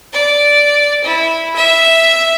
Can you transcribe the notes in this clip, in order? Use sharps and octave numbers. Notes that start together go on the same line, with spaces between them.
D5
E4
E5